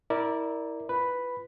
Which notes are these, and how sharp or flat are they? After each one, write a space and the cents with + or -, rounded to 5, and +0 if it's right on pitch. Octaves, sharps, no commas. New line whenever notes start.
E4 -25 A#4 +0 D5 +0
F4 -20 B4 +5 B5 +0